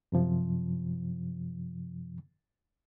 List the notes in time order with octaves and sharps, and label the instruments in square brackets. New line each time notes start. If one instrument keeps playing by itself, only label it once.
[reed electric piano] F#2 C3 F3